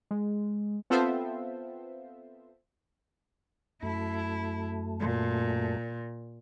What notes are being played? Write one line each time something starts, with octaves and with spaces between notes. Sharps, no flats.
G#3
B3 C4 F4 A4 C5 E5
F#2 A3 E4
A#2